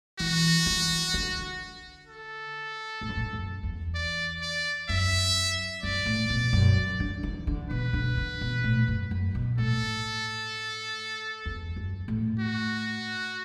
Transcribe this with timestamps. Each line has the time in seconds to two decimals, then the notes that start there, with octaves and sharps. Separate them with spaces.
0.20 E3 F#4
0.66 E3
1.14 D3
2.07 A4
3.01 A2
3.09 F#2
3.16 A2
3.33 F#2
3.63 E2
3.95 D5
4.42 D5
4.89 F#2 E5
5.83 F#2 D5
6.06 A2
6.30 B2
6.53 F#2
7.00 D3
7.23 E3
7.47 D3
7.70 B2 B4
7.93 D3
8.17 D3
8.41 B2
8.64 A2
8.88 F#2
9.11 F#2
9.35 B2
9.58 A2 A4
11.45 E2
11.76 F#2
12.08 A2
12.39 F#4